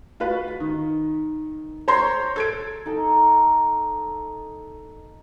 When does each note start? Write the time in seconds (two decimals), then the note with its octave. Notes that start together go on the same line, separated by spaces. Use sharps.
0.20 F4 F#4 B4
0.60 D#3
1.88 C5 C#5 A#5 C6
2.36 A4 G#6 D7
2.86 D#4 A4